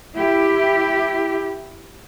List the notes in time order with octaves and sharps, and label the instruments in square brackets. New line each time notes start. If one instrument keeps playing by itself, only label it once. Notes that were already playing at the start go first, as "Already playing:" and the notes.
[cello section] E4 G4